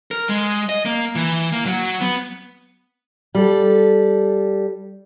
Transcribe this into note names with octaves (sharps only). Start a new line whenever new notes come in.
A#4
G#3
D#5
A#3
E3
A#3
F#3
B3
G3 A4